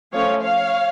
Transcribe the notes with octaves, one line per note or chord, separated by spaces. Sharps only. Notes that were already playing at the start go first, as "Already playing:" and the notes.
F3 A3 C#4 C#5 F5
C#5 F5